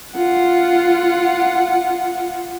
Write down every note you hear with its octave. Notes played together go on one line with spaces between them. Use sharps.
F4 F#5